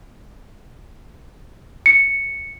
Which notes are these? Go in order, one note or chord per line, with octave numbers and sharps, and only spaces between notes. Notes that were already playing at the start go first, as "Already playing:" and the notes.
C#7